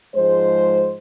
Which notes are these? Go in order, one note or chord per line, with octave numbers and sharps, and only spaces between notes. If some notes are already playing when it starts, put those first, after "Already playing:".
G#2 F3 G#3 C5